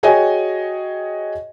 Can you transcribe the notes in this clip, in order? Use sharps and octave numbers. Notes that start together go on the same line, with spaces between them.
F#4 G#4 C#5 D#5 G5 G#5